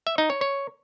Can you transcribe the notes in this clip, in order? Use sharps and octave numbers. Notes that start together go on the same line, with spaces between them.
E5
D#4
C#5
C#5